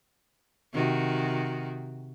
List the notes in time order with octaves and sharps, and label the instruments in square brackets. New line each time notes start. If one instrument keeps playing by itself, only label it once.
[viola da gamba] C3 D#3 F#4